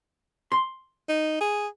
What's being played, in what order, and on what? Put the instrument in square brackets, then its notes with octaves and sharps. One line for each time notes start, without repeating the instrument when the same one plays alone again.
[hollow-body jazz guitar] C6
[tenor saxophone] D#4
G#4